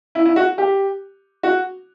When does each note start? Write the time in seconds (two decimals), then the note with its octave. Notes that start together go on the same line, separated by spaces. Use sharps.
0.15 E4
0.25 E4
0.36 F#4
0.58 G4
1.43 F#4